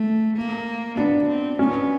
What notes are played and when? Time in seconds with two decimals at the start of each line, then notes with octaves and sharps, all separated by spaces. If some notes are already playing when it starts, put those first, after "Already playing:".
Already playing: A3
0.37 A#3
0.97 B3 D4
1.28 C4
1.59 B3 C#4